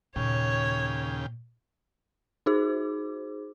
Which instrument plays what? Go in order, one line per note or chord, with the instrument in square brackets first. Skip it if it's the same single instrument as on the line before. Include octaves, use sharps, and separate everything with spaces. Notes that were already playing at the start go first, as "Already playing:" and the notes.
[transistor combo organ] D#2 C#3 G5 [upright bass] A#2 [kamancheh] C#5
[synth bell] D#4 F#4 G#4 C5 D6